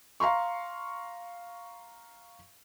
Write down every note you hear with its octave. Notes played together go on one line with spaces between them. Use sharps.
F5 A#5 C6 C#6